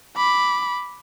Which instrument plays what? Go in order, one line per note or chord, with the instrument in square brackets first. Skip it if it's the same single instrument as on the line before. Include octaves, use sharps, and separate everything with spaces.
[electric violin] B5 D6